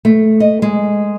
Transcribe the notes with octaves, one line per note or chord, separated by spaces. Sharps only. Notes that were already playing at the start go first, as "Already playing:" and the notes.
A3
D#5
G#3